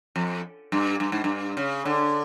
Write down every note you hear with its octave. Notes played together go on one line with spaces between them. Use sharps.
F2
G2
G2
G#2
G2
C#3
D3